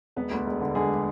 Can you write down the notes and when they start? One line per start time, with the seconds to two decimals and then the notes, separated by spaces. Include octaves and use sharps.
0.16 E1 B3 B4
0.32 D2
0.46 E1
0.61 D3
0.75 D3 G#3 G#4